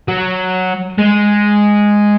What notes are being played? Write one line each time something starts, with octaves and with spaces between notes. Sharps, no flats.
F#3
G#3